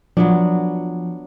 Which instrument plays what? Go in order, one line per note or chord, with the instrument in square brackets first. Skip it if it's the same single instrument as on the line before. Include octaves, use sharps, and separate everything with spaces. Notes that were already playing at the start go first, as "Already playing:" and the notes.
[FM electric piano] F3 [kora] F#3 B3 D4